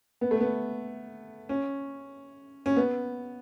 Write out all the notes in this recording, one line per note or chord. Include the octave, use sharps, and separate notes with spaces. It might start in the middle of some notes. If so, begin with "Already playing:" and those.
B3
A3
B3
C#4
C#4
B3